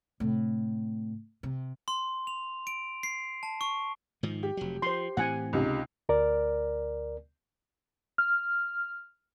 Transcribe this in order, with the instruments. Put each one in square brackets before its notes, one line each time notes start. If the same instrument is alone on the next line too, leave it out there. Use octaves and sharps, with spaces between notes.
[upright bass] A2 C3
C3
[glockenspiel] C6
F7
D7
C7
A5
C#6
[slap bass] G#2 D#3 F3
[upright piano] G4
[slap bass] F1 F#3
[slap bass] F3 [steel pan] C5 C6
[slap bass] A2 E3 C4 [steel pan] F#5 G#5
[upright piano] C#2 C3 D#4
[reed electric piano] D2 A#4 D5
[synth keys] F6